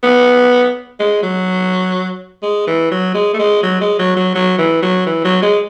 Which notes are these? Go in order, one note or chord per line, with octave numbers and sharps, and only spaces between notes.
B3
G#3
F#3
G#3
E3
F#3
G#3
A3
G#3
F#3
G#3
F#3
F#3
F#3
E3
F#3
E3
F#3
G#3